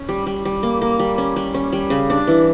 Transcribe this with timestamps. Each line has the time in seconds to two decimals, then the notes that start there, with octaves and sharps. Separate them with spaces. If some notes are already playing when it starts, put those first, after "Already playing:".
Already playing: C#4
0.09 G3
0.26 G3
0.45 G3
0.63 A#3
0.81 A#3
0.99 G3
1.18 C#4
1.36 G3
1.54 C#4
1.72 G3
1.90 C#3
2.10 D4
2.27 E3